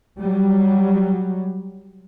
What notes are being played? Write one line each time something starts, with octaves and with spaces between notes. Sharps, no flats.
F#3 G3